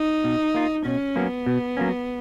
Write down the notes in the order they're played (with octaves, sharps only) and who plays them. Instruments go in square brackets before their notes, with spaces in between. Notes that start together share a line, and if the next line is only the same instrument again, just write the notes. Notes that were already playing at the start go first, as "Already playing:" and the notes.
Already playing: [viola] D#4
[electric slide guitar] B2
A#3 F4
[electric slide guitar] B2 [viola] C#4
[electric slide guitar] F#3 A#3 C#4 [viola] B3
[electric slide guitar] B2
F#3 A#3 C#4